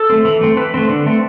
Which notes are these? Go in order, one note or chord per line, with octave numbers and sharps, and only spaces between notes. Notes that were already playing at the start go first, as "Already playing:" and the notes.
Already playing: A4
A3 C4
E3
A3 C4
E3 B4
A3 C4
D3
A3 C4